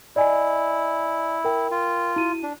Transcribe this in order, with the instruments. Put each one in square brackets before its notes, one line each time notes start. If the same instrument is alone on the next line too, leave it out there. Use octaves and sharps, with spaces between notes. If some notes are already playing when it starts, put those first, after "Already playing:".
[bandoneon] E4 [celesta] D5 D#5 G#5
[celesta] A#4 G5
[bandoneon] F4
[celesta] E4 F#4 D#7
[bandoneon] D4